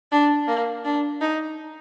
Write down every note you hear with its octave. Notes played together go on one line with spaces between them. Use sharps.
D4
A#3
D4
D#4